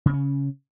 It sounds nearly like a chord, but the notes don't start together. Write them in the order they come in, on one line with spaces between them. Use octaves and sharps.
C#3 C4 C#4